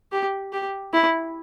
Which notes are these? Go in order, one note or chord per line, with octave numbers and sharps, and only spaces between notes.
G4
G4
E4